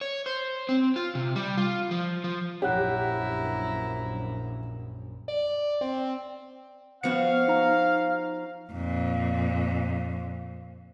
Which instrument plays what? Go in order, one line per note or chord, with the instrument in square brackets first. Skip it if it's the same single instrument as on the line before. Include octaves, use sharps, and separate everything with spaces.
[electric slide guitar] C#5
C5
C4
F4
C3
G3
F4
F3
F3
[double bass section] A#1 F#2 [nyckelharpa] E4 A#5 [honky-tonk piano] G4 [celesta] C#5 F#5 F#6
[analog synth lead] D5
C4
[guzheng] F3 F#4 [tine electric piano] B3 C#7 [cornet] F5
[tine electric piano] D#4 A#5
[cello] F2 A#2